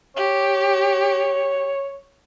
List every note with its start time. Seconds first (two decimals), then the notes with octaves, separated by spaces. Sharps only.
0.16 G4 C#5